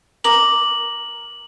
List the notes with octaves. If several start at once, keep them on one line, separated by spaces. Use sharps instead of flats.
A#4 D6 F#7